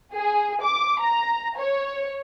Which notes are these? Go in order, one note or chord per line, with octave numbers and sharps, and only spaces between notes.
G#4
D6
A#5
C#5